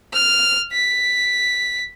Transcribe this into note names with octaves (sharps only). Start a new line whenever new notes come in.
F6
B6